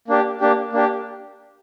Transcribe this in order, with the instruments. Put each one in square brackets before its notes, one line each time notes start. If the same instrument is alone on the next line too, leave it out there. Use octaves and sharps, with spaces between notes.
[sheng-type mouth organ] A#3 D4 G4
A#3 D4 G4
A#3 D4 G4